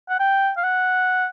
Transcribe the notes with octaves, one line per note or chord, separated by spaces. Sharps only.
F#5
G5
F5
F#5